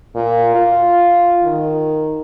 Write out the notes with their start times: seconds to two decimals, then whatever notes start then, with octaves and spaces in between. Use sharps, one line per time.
0.15 A#2
0.55 F4
1.44 D#3